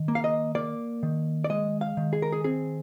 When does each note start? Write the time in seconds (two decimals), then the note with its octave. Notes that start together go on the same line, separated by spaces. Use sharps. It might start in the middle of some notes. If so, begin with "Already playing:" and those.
Already playing: D#3
0.08 A#3
0.15 F5
0.24 D#5
0.55 A#3 D5
1.03 D#3
1.44 D5
1.50 G#3 D#5
1.81 F5
1.97 D#3
2.13 G#4
2.22 A#4
2.32 G#4
2.44 C4 G#4